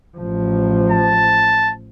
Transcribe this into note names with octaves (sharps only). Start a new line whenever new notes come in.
A1 F3
A5